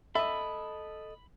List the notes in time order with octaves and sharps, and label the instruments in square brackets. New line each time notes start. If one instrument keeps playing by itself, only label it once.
[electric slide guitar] A4 D#5 [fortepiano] E5 [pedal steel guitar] B5